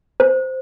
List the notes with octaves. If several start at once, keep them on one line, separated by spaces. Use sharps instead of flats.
C5